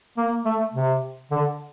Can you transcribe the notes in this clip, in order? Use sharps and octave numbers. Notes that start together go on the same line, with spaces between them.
A#3
A3
C3
D3